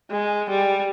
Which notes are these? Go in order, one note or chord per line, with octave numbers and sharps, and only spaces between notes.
G#3
G3